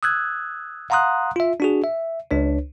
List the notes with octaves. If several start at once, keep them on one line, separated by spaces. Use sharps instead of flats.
D#6 E6 F#6 G#6
F5 F#5 A#5 C6 D#6 F#6
F4 E5
D4 F#4 G#4
E5
C#2 D4 C#5